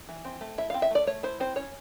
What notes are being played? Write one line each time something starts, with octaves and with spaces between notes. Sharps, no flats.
E3
C4
A3
E4 E5
C4 F5
E5
A3 D5
A3 C#5
E4 C5
C4 C5
C#4 C#5